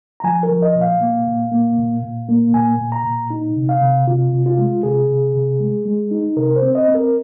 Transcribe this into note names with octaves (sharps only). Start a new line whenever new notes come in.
A#5
F3 G#5
A#4
F3
D#5
A#2
F5
A#3
A#2
A#3
A#2
A#2
A#3
A#2 G#5
A#2
A#5
A#2
D#4
C3
F5
C3
C3 F4
C3
F4
G#3
C3 G#4
C3
C3
G#3
G#3
D#4
C3 A#4
C5
C4
D#5
C4
A#4